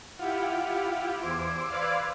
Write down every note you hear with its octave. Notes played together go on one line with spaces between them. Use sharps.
E4 F4 G4 F#5
E2 C5 D6 E6 G#6
B4 D5 F5